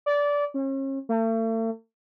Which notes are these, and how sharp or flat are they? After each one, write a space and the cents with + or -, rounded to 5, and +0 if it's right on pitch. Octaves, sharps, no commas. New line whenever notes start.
D5 -20
C#4 -40
A3 +40